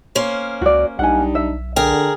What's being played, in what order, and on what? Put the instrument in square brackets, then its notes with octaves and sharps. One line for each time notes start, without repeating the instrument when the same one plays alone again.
[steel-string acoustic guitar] A#3 C#4 C5
[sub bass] C#2 [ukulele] F#4 D5
[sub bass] B1 [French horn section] G3 D4 D#4 [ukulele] F#5 G#5
[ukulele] E5
[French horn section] D3 [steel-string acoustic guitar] G#4 A#4 [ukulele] G5